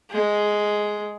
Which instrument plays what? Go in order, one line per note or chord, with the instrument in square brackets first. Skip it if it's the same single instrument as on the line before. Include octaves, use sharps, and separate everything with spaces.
[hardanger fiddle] G#3